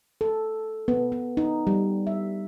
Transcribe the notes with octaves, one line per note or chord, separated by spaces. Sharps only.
A4
B3
B3
D#4
G3
E5